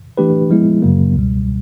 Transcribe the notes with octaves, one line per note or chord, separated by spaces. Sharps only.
E3 A3 D4 G4 B4
F3 G#3 B3 E4
F#2 C#3 F#3 A#3
C#2 B2 G3